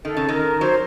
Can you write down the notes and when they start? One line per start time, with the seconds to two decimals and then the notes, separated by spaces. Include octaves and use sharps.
0.05 D#3 A4
0.17 C#3
0.29 D#3 A#4
0.61 F#3 C5